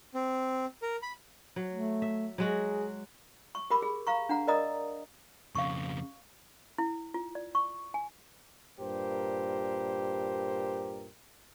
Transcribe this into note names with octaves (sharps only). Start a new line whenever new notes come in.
C4
A#4
B5
F#3
A3
E5
F#3 G#3 F#4 G#4
C#6
G4 A#4 B5 D6
G#4
F5 A#5 C#6
D4 F#5 A#5
A#4 D5 D#5 A#5 D#6
F2 C#3 F5 C#6
E4
F4
D5
C#6
G#5
G2 A#2 G4 A#4 C5